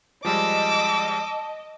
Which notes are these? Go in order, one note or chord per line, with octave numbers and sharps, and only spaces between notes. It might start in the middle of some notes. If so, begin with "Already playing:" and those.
F3 G3 G#3 D#5 A5 D6 E6